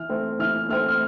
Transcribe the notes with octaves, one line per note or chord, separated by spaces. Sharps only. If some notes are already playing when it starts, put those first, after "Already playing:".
Already playing: E3 F6
A3 C4
E3 F6
A3 C4 F6
F6